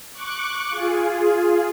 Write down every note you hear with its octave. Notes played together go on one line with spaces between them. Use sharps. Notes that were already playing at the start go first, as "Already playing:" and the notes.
C#6 D6 F#6
F4 G#4